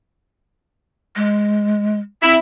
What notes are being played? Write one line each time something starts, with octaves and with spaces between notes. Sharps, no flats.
G#3
C4 E4